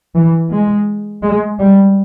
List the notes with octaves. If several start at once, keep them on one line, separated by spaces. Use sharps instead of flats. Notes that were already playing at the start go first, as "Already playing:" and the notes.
E3
G#3
G#3
G3